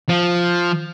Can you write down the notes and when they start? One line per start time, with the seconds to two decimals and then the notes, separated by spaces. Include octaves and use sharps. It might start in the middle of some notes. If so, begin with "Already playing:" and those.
0.09 F3